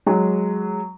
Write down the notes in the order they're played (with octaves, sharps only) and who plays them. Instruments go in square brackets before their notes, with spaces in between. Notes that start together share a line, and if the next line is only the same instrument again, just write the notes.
[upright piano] F#3 G#3